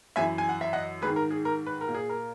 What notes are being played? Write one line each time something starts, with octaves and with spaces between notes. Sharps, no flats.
F#2 E3 E5 G#5
G#5
F#5
E5
D#5 F#5
G#2 D#3 G#4 B4
A#4
G#4
A#4
B4
A#4
A#2
G#4
A#4